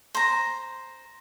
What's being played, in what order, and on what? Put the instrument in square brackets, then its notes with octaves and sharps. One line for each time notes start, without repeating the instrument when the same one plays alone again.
[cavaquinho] C5 A#5